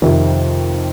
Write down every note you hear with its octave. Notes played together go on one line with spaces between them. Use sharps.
F2 C3 D#3